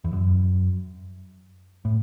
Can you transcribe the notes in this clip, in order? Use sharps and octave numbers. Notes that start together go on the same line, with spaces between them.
E2
F#2
A2